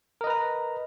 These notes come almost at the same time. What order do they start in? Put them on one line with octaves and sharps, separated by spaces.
A#4 D#5 B4 A#5